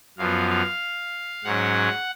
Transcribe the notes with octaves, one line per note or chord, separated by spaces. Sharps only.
F#2 F3 B3 F5
F5
G#2 F#3 C#4 F#5